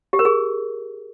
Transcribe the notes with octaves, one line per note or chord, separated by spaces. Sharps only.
G4
A#4
G#4